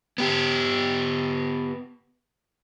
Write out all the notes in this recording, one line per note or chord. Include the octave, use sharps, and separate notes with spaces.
B3 G4